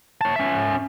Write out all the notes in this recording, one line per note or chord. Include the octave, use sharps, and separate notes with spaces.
C#5 A5
C#4 E5